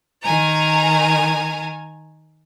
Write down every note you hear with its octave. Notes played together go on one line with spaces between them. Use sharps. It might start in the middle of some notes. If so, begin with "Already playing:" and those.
D#3 G#5 A#5